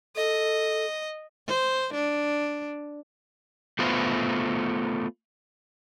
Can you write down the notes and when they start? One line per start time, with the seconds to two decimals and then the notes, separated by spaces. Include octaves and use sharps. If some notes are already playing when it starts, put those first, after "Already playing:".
0.16 A4 D#5
1.47 C5
1.94 D4
3.79 A3 B3 F4 B4 C5